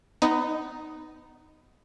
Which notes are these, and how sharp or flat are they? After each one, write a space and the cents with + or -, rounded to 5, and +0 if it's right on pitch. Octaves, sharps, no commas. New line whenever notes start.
B3 +25 D#4 +0